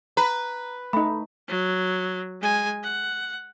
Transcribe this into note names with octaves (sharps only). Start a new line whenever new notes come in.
B4 A#5
A3 D#4 B5
F#3
G#3 G#5
F#5